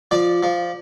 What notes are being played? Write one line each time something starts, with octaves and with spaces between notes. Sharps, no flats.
F3 D5
F3